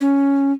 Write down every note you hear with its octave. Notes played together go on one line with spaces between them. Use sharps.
C#4